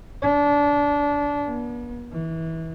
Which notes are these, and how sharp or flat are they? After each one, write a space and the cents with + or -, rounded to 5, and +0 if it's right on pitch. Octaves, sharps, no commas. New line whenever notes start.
D4 -25
B3 -45
E3 -25